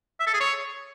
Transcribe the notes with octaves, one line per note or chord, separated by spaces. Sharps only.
E5
A4
G#4
C#5